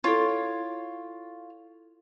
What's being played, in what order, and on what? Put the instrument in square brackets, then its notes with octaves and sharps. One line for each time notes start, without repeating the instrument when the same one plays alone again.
[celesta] E4 A4 [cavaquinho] F4 C#5